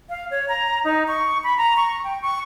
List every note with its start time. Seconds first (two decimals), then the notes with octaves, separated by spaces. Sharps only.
0.10 F5
0.31 C#5
0.49 A#5
0.84 D#4
1.08 C#6
1.44 B5
1.58 A#5
1.77 C#6
2.04 G5
2.22 C#6